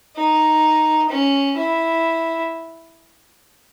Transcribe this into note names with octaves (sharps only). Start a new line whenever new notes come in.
D#4
C#4
E4